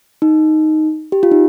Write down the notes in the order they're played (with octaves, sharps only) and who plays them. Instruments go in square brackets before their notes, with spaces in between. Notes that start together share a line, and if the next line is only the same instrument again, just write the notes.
[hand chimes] D#4
G4
F4
D#4